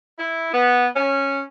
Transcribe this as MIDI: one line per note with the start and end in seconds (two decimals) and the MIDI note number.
0.18 0.52 64
0.53 0.87 59
0.95 1.41 61